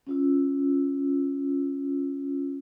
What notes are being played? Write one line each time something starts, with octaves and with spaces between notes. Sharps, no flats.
C#4 F4 E6